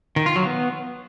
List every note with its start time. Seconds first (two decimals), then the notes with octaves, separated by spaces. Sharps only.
0.16 D#3
0.26 F4
0.36 F#3
0.46 B3